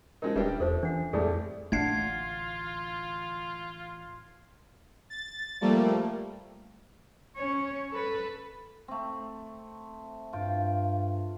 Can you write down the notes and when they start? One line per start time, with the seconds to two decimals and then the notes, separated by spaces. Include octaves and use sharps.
0.22 F3 G#3 C#4 D#4 A#4
0.36 D#1 G3 D4 G4 B4 E5
0.60 E2 F3 A4 C5 E5
0.83 E3 D4 F#5
1.13 F2 A2 G3 A3 G#4 A4 D5
1.72 A1 D3 A3 D4 F4 F#5 G#6 C7
5.10 A6
5.61 F3 G3 A3 A#3
7.36 C#4 C#5
7.91 A4 B4
8.88 A3 C4
10.33 G2 F4 G5